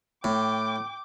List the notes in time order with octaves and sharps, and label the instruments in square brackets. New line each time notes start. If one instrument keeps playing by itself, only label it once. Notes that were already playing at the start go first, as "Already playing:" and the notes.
[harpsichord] A2 [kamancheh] G5 D6